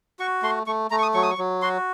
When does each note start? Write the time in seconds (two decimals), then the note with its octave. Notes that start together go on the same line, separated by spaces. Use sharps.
0.19 F#4 C#6
0.43 A3 C6
0.67 A3 C#6
0.91 A3 A#5
0.99 C#6
1.02 D#6
1.14 F#3 C#6
1.23 D#6
1.31 C#6
1.38 F#3
1.62 F#4 C6